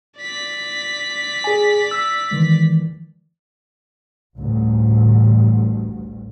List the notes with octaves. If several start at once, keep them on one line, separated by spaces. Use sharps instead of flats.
D5 B6
G#4 G#5
E6
D#3 E3 G#3
A1 D2 G2